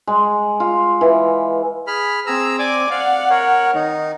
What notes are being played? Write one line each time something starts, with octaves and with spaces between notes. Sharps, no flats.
G#3
F4
E3
G#4 B5 F6
C4 G#4 A#5 E6
D5 G#5 D6
D5 F5 F#5
A#4 C#5
D#3 D#4